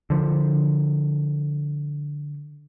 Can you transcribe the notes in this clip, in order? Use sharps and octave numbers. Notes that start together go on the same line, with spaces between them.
D3 F3